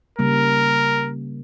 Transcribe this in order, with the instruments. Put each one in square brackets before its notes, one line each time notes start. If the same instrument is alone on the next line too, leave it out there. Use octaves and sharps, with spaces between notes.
[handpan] C#3 G3 A#3 [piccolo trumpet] A#4